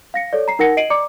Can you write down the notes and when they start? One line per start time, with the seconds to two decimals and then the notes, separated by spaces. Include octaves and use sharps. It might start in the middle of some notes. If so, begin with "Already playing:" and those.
0.14 F5 A#6 C#7
0.33 A4 C#5 D5
0.48 A#5 C7
0.59 D#4 A#4 F#5 A#6 C#7
0.77 D#5 C7 D7 D#7 F#7
0.90 D5 A#5 D6 C#7